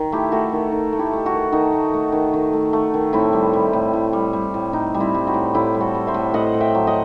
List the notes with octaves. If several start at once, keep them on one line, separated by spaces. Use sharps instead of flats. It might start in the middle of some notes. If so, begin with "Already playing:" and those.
Already playing: D#3
A3 E4 G4
A3 F#4 A4
D#3
D#3
A3
E4 G4
A3 G4
F#4 A4
D#3
D#3 D#4 F#4
A3
A3
D#3
D#3
A3
A3
D#3
A2 C4 E4
G3
G3
A2
A2
G3
G3
A2
A2 D#4
G3
C4 E4
G3
D#4 F#4
A2
A2 E4 G4
G3
F#4 A4
G3
C5 E5
A2
A2 D#5 F#5
A2
E5 G5
F#3
D#5 F#5